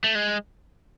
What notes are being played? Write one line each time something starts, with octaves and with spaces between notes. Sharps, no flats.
A3
G#3